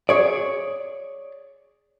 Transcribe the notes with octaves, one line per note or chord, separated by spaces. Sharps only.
G#4 C#5 D5